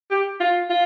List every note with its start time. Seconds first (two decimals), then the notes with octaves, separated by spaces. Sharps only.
0.11 G4
0.40 F4
0.69 F4